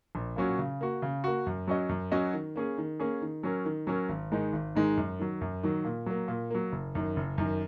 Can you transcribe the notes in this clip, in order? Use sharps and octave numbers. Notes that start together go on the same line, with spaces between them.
A#1
A#2 F#3 C#4 F#4
C#3
A#3 F#4
C#3
A#3 F#4
F#2
F#3 C#4 F#4 D#5
F#2
F#3 C#4 F#4 D#5
D#3
A#3 C#4 G#4
D#3
A#3 C#4 G#4
D#3
F#3 C#4 A#4
D#3
F#3 C#4 A#4
G#1
G#2 D#3 G#3 D#4
G#1
G#2 D#3 G#3 D#4
F#2
D#3 F#3
F#2
D#3 F#3
A#2
F#3 A#3
A#2
F#3 A#3
F#1
F#2 D#3
F#1
F#2 D#3